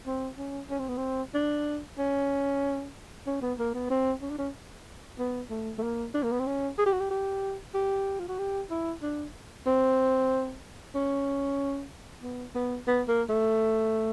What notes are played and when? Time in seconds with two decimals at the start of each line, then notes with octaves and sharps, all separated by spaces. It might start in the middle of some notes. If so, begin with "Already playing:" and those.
0.06 C4
0.38 C#4
0.70 C#4
0.79 C4
0.89 B3
0.97 C4
1.34 D4
1.98 C#4
3.27 C#4
3.42 B3
3.59 A#3
3.74 B3
3.90 C4
4.22 C#4
4.30 D4
4.38 C#4
5.19 B3
5.50 A3
5.78 A3
5.83 A#3
6.14 D4
6.23 A#3
6.32 B3
6.39 C4
6.47 C#4
6.78 G#4
6.86 G4
6.93 F#4
7.00 G4
7.11 G4
7.74 G4
8.19 F4
8.28 F#4
8.39 G4
8.70 E4
9.02 D4
9.67 C4
10.95 C#4
12.23 B3
12.55 B3
12.87 B3
13.08 A#3
13.30 A3